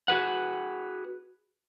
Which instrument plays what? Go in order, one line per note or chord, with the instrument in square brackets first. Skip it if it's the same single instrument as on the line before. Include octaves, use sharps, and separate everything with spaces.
[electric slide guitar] F#4 G#4 B4 F#5